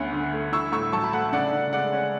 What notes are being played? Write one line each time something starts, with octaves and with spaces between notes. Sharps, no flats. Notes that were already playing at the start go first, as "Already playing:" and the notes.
Already playing: D2 B3 C#4 F#5
D3
A3
E4 C#6 E6
A2 C#6 E6
F#3 A5 C#6
B5
A3 F#5 A5
C#3 D5 F#5
C#3
G#3 D5 F#5
C#4